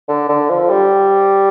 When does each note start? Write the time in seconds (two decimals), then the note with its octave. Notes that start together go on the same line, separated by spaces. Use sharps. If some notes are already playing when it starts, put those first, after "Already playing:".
0.08 D3
0.29 D3
0.49 F3
0.70 G3